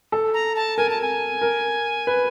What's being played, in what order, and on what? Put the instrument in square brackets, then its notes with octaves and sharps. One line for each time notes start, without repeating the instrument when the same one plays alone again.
[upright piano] A4
[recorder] A#5
A5
[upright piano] A#4 [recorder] G#5
[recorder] A5
G#5
[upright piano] A#4
B4